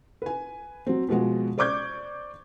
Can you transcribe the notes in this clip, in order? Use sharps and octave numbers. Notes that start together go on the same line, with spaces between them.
B4 G#5
F#3 C4
B2 F3 G#3 F#4
C5 D5 C#6 D6 G6 G#6